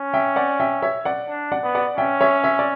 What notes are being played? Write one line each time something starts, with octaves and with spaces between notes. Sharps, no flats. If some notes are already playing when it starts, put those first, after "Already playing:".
Already playing: C#4
E5 G5
D5 F#5
E5 G5
C#5 E5
D5 F#5
D4
D5 F#5
B3
D5 F#5
C#4 E5 G5
C#5 E5
C#5 E5
D5